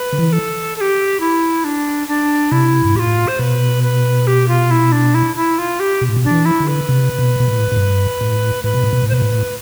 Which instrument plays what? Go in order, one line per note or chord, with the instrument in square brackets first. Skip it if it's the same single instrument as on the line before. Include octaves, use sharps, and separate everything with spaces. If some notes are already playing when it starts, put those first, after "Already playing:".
Already playing: [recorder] B4
[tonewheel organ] D3
E3
[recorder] A4
A4
G4
E4
D4
D4
[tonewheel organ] C3 [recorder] E4
[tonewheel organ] G2
[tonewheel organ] A2 [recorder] G4
[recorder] F4
C5
[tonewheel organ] B2 [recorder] B4
[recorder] B4
G4
F4
E4
D4
E4
E4
F4
G4
[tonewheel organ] B2
A2
B2
[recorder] D4
[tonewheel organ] E3
[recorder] E4
[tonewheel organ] D3
[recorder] B4
[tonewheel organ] C3
B2
B2
A2
A2
G2
A2
[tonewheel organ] A2 [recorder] B4
[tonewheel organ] B2
A2
B2
A2
[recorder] C5
[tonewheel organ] B2 [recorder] B4
[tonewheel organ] A2